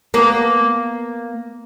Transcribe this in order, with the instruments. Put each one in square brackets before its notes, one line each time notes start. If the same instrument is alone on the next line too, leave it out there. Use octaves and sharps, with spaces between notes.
[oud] A#3 B3